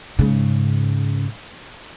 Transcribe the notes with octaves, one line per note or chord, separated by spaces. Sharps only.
G#2 C#3